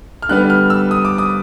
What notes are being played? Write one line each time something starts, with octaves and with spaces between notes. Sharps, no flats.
F6
D3 G3 B3 F#6
F6
E6
D#6
D6
D#6